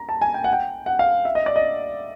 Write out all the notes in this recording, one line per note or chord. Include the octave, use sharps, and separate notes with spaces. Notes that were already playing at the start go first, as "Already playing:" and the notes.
Already playing: A#5
A5
G#5
G5
F#5
G5
F#5
F5
E5
D#5
D5
D#5